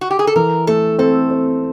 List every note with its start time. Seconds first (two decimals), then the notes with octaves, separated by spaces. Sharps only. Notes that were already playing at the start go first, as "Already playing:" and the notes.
0.01 F#4
0.11 G4
0.19 G#4
0.27 A4
0.36 E3 A#4
0.67 A3 A4
0.99 C4 A4
1.31 C4